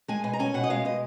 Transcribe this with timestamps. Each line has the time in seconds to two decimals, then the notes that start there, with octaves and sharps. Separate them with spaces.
0.08 G#3 G#5
0.24 B2 G#5
0.33 A#5
0.39 C#4 G#5
0.54 B2 F#5
0.63 D#5
0.70 G#3 F5
0.85 B2 D#5